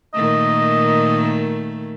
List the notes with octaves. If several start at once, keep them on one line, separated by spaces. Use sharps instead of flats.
A#2 D#3 A3 D#5